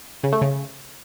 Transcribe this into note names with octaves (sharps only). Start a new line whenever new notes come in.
C#3
A3
C#3